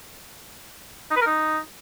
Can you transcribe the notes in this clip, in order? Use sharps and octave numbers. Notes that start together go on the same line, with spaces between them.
D#4
B4
A#4
D#4